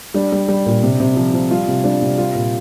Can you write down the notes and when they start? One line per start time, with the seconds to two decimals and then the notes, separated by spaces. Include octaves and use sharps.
0.14 G3 D4
0.32 G3
0.48 G3
0.66 A#2
0.83 C3
1.00 C3
1.16 F3
1.34 F3
1.51 G3 F4
1.68 C3
1.84 G3 D4
2.02 C3
2.18 G3 F4
2.35 A#2